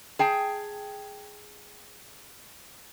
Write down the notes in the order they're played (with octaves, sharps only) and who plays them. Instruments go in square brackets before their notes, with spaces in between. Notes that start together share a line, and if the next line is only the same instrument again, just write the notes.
[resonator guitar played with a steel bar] G#4 G5 A5